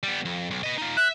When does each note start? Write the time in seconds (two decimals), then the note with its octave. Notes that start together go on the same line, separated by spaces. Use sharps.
0.03 G3 B3
0.25 F2
0.51 B1
0.63 B4 D#5
0.78 D#4 F4
0.97 E5 F#6